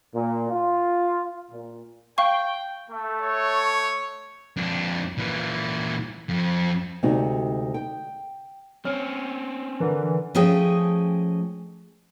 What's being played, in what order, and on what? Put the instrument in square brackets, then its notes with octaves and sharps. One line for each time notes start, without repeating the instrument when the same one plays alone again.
[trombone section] A#2
F4
A#2
[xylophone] F5 C#6 [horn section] G5
[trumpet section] A3
[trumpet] C#5
[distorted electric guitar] F2 D4
A#2 E3
F2
[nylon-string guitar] D2 C3 G#3 C4 D#4 F#4
G5
[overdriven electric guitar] C4 C#4 [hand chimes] C#5 [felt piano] F6
[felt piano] D3 A#4 [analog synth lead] E3
[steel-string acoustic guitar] F3 A3 C#4 G#4 D#5 G5